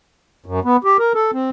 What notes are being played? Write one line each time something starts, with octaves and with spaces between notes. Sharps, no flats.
F#2
B3
G4
A#4
A4
C4